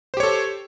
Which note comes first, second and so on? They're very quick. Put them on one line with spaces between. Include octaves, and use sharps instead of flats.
C5 G4 C#5 A4